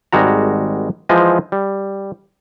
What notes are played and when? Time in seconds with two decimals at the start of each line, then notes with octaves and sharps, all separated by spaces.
0.12 G#1 G3 G#3 F#4 A#5
1.09 E3 F3 G#3 C5 D#5
1.52 G3